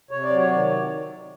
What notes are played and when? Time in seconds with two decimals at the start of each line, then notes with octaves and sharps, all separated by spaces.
0.11 C3 C#5
0.23 D5
0.30 F#3
0.37 C#5
0.50 D#3 D5
0.64 C#5
0.70 C3